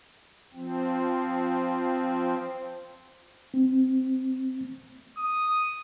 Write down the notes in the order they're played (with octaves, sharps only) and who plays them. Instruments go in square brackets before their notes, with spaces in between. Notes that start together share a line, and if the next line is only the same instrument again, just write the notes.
[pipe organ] F3 C4
[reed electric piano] C4
[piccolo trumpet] D#6